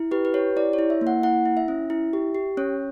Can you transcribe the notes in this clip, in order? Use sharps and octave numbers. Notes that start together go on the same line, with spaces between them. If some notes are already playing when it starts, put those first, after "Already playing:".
Already playing: E4
G4 B4
B4
G4 C#5
E4 D5
C#5
E4
E5
A#3
F#5
E4 F#5
E4
E5
C#4
E4
G4
G4
C#4 C#5